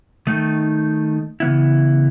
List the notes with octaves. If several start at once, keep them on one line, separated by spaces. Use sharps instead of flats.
D#3 A3 D#4
C#3 E3 B3 E4